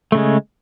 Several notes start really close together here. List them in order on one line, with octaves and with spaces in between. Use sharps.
A3 C#3 G#3